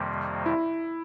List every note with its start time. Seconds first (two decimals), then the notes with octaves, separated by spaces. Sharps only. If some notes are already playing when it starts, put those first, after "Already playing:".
Already playing: F2 C3 D#3 G3 A#3
0.46 E4